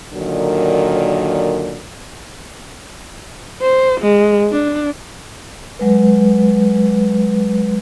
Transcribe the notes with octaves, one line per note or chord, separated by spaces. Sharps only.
A#2 D3 D#3 F#3
C5
G#3
D4
F#3 G#3 B4